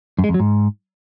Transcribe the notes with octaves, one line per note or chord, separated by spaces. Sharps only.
F#2
G#3
F2
F#3
G#2